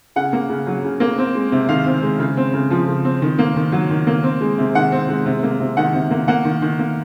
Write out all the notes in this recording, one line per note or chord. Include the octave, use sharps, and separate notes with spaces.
C#3 F#5
A#3
C#3
F#3
C#3
A#3
C4
G#3
C3
D#3 F5
C4
G#3
C#3
C4
C#3
F3
C#3
C4
D#3
A#3
D#3
F#3
D#3
A#3
C4
G#3
C3
D#3 F#5
C4
G#3
C3
A#3
C3
D#3 F#5
C3
A#3
A#3 F#5
D#3
D#3
A#3